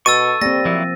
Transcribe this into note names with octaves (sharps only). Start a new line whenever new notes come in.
B2 A4 C#6 E6 A6 D#7
G3 A#3 C4 A#6
F3 F#3 A#3 E4